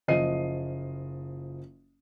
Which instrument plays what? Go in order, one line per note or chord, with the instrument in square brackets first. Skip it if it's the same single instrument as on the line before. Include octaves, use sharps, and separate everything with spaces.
[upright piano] F#1 F3 D#5 C7 D#7